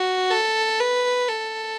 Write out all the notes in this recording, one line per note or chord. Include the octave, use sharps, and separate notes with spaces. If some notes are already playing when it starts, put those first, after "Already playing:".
Already playing: F#4
A4
B4
A4